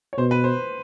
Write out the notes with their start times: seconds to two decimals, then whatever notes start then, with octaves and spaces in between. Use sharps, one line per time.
0.13 C#5
0.18 B2 C5
0.31 B4
0.44 C5